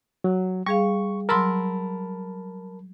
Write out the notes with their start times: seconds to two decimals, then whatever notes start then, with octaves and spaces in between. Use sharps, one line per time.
0.24 F#3
0.66 G3 G#4 F5 C#6
1.29 F#3 A#4 A5 B5 C6 E6